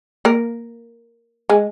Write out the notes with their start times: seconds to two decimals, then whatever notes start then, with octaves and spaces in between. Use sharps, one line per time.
0.25 A#3 A#4
1.49 G#3 G#4